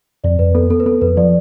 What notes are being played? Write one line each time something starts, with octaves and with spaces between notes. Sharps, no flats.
F2 D5
F2 B4
B3 A4
B3 A4
B4
B3 A4
F2 B4
F3 D5